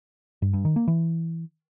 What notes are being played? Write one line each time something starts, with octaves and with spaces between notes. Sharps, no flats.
G2
G2
D#3
A#3
E3